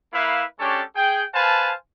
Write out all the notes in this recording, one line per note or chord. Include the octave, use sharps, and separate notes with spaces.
A#3 E4 B4 E5 F5
G#3 C#4 D4 G4 A4 C#5
G#4 G5
B4 C5 F5 G#5 A5